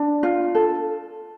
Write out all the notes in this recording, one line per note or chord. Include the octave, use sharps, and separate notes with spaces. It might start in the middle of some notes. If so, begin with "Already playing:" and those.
Already playing: D4
F4
A4